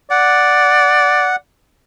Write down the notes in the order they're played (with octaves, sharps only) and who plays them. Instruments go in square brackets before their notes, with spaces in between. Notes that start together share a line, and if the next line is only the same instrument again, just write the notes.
[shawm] D5 [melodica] F#5